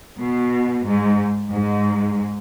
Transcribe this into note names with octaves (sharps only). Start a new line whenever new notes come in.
B2
G#2
G#2